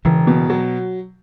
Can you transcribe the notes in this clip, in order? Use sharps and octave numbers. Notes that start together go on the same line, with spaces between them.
E1 C#3 E3
B2
F#3